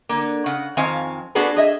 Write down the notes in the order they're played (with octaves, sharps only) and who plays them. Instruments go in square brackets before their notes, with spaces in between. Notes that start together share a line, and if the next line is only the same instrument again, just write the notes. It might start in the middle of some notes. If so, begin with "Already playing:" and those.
[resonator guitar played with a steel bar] D3 A#3
C#3 F#5
F2 D#3 C4 F5 G#5
B3 D4 F#4 G#4 A4 B4
G#4 D#5 E5